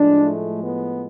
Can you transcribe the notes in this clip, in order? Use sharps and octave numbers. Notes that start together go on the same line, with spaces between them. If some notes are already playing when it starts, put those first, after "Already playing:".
Already playing: A2 F3 G#3 D4
A3
B3